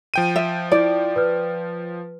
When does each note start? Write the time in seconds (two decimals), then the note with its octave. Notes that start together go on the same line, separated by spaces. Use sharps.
0.14 F3 G5 D#7
0.36 E5
0.72 E4 D5
1.16 B4 F6